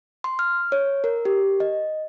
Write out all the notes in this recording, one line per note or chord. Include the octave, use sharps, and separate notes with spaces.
C6
F6
C#5
A#4
G4
D#5